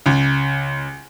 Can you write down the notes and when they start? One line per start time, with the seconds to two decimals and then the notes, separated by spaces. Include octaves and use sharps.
0.06 C#2